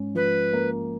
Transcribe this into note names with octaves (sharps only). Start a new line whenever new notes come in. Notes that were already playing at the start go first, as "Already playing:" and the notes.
Already playing: G#2 C#4
F3 B4
A#3